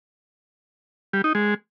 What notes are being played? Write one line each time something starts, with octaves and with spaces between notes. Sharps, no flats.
G3
D#4
G#3